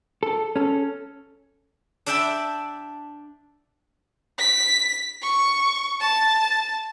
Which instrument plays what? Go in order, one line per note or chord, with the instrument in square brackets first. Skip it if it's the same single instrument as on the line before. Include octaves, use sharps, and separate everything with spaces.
[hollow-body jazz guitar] A4
C#4 A4
[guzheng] D4 D5 E5 G5 A5 B5
[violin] B6
C#6
A5